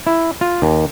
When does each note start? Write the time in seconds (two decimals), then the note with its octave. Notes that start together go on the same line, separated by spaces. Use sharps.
0.07 E4
0.41 F4
0.62 D#2